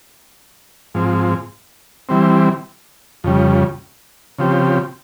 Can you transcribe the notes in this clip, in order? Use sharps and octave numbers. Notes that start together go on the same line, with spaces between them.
G#2 F3 C4
E3 G3 C4
F2 C#3 G3
C#3 F3 C4 G4